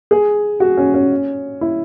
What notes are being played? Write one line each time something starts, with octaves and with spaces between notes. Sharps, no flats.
G#4
F#4
C#4
C#4
E4